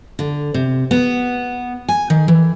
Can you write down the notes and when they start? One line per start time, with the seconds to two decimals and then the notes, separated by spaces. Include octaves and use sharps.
0.19 D3
0.54 C3
0.91 B3
1.89 G#5
2.10 D#3
2.28 E3